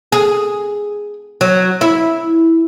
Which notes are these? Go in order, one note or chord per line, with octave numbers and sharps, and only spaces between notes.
G#4
F#3
E4